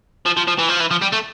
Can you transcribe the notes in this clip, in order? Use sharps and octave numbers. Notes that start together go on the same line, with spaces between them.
F3
F3
F3
E3
F3
E3
F3
G3
A3